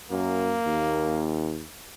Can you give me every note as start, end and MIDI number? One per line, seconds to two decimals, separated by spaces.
0.11 0.58 42
0.11 1.36 58
0.66 1.65 39